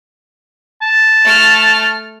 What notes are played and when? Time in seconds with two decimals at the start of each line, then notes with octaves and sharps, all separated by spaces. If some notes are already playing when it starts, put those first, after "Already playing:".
0.82 A5
1.24 A3 F6